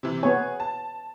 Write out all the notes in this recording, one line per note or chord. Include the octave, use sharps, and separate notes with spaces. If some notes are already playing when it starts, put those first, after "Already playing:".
C3 E3
B3 G#4 C#5
A5